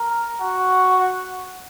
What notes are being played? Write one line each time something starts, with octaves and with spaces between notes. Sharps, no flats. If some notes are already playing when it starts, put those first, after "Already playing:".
Already playing: A#4
F#4